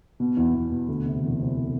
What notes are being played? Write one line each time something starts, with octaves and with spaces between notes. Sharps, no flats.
B2
E2
E2
B2
D2
C3
E1
C3